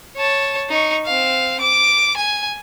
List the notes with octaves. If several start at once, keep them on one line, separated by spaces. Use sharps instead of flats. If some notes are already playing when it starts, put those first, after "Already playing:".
C#5 A5
D#4 C#6
C4 F5
D6
G#5